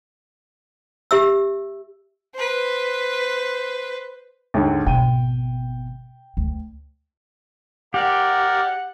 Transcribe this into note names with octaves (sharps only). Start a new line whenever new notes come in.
G4 E5 E6
B4 C5
D#2 G#2 D3
G#1 B2 G5 D#7
D2
G4 A#4 D5 F#5